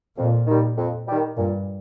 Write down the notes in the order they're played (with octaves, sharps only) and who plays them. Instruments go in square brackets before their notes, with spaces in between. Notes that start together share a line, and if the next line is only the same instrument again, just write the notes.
[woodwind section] F2 [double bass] A#2
[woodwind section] D#3 G3
F2
D#3 G3
[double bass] G2 [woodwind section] A#2